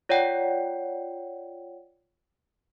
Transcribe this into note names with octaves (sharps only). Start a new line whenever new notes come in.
F4 C#5 D5 F#5 G5